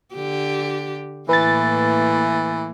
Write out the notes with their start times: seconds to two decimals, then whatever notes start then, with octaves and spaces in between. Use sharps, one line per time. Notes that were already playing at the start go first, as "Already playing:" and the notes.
0.15 D3 G4
1.29 A2 E3 A#3 B4 A6